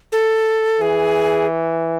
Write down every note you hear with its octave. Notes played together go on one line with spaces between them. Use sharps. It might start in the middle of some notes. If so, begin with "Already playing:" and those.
A4
E3 G#4